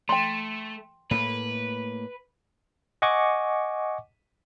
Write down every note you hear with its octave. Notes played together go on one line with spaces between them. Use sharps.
A3 G5 C6
A2 A#3 B4
D#5 F#5 G#5 C#6 D6